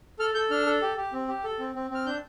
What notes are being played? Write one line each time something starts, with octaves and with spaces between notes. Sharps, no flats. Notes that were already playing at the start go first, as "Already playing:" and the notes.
A4 F6
A4 G6
D4 F6
A4
G4
G4
C4
G4
A4
C4
C4
C4 F6
D4 G6